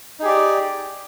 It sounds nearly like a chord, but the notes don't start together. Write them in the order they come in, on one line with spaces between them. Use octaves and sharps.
D#4 G#4 G4 D5